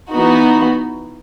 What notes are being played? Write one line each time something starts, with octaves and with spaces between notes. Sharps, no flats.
E3 B3 D#4 F#4